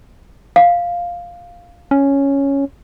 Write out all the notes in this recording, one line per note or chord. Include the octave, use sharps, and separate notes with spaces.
F5
C#4